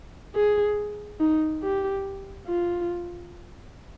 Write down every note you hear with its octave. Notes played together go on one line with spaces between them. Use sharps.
G#4
D#4
G4
F4